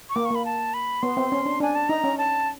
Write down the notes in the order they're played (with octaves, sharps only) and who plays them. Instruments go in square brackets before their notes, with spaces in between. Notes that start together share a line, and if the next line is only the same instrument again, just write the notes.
[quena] C#6
[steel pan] A#3 [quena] D6
[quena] C#6
[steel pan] A#3 [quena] B5
[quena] A5
B5
[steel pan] B3 [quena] C6
[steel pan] C4
C#4
D4
[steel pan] D4 [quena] G#5
[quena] A5
[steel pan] D#4 [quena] A#5
[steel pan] C#4
[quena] A5